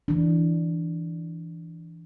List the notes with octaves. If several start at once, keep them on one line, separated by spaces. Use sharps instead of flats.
E3 D4